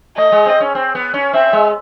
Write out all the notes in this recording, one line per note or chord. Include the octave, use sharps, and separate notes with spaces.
A3 D#5
G#3
C4
C#4
C4
B3
C#4
C4 E5
G#3